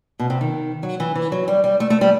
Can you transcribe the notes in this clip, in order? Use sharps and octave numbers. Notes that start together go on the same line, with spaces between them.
B2
C3
D#3
F#3
E3
E3
F#3
G3
G3
A3
A3
G3